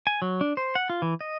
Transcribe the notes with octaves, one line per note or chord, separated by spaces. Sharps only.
G#5
F#3
D4
C5
F#5
F4
E3
D#5